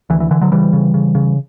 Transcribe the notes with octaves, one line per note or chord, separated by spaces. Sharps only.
D2 E3
E3
D3 E3
D3 F#3
C#3 E3 G3
C#3
C#3
C#3